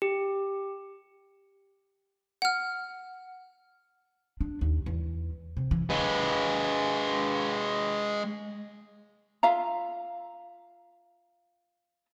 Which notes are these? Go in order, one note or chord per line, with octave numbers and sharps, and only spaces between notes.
G4
F#5 F6
D4
D#2
E2
C3
E3
G#3 B4
F4 E5 F5 A#5